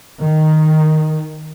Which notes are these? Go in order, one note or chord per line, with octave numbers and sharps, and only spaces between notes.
D#3